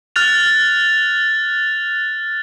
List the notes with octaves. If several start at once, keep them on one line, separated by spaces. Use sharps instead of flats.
F6 F#6 A6 F7